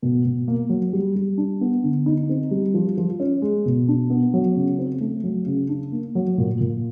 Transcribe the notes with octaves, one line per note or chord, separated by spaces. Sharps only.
B2
B2
A#3
F#3
G3
G3
D4
B3
D3
D#4
C4
G3
F3
F3
C#4
G#3
B2
D4
B3
F#3
C#3
C4
A3
F#3
C#3
D4
A#3
F#3
A#2
A#2